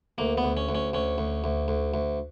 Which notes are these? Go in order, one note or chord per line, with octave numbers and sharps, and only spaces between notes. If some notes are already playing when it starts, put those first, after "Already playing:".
D2 A#3
B3
D2
C#4
D2
C#4
D2 C#4
D2
D2
D2
D2